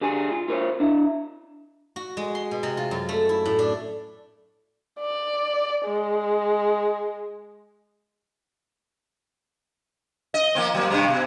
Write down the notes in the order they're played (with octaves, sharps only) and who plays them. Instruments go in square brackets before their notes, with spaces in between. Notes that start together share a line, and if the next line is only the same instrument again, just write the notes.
[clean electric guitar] D3 G4 G#4 D5 G#5
F4
F4 A#4 C5 C#5
D4 E4
[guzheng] F#4
G#3
C6
B2
C3
F4
F#2
A3
E4
A2
D4
[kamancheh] D5
G#3
[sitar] D#5
F3 A#3 C4
F#3 A#3
G2 C3 G3
B2